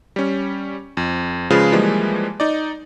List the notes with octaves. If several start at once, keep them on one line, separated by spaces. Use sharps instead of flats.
G3 C#4
F2
C#3 F3 G#3 F4 B4
E3 F3 G3 G#3 A#3
D#4 D5